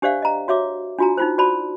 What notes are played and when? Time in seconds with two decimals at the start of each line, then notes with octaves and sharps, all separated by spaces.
0.02 D4 G4 C5 D5 E5 F5
0.22 D#5 A#5
0.48 F#4 C#5 E5 D6
0.99 D4 F4 F#4 G#5 A#5
1.17 D#4 F4 C5
1.38 F#4 C5 D5 A5 B5